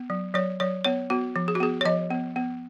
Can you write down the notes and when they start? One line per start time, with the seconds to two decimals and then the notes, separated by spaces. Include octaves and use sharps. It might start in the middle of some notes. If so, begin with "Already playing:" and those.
Already playing: B3
0.10 F#3
0.34 F#3 C#5
0.60 F#3 C#5
0.84 B3 C#5
1.10 B3 F#4
1.36 F3
1.48 G#4
1.55 F#4
1.60 B3 G#4
1.81 C#5
1.85 F3 D#5
2.11 B3
2.36 B3